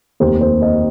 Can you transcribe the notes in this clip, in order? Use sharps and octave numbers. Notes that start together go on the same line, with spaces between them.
F1 D#2 D#3 C5
C5
D#5